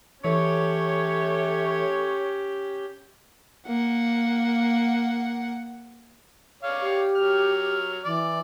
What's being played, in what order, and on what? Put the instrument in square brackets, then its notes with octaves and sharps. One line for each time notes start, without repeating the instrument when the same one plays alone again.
[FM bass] E3 [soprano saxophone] A3 [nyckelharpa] C#4 G4 [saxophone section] C#5
[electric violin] A#3 F#5
[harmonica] C#5 D5 F5
[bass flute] G4
[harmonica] F#3 F6
[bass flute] E3 [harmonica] D5